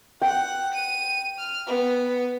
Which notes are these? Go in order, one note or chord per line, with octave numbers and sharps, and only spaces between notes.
F#5 G5 F#6
D#7
F6
B3